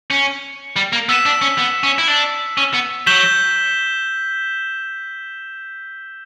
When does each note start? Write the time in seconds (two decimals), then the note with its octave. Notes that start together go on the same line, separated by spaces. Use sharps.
0.10 C#4
0.76 G3
0.93 A#3
1.09 B3 E6 B6 E7
1.26 D4
1.42 C#4
1.58 B3
1.83 C#4
1.98 E4
2.08 D4
2.58 C#4
2.74 B3
3.07 F#3 G6 B6 E7 G7